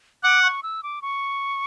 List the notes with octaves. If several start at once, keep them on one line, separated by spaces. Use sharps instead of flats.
F#5 D6
C#6
E6
D6
C#6